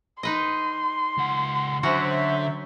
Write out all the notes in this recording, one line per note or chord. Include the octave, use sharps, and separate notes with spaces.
D#4 B4 D#5 C6
C#2 F#5
D3 F#3 C#4 F#4 C5 E5